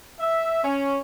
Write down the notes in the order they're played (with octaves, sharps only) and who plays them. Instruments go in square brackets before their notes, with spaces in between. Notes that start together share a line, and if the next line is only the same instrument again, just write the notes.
[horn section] E5
C#4